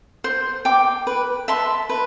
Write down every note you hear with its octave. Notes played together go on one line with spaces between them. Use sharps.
C5
G5 D6
B4
E5 A5 C6
B4